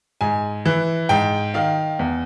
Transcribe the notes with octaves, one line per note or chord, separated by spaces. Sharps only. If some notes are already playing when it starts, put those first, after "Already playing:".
G#2 G#5
E3
G#2 G5
D#3 F5
E2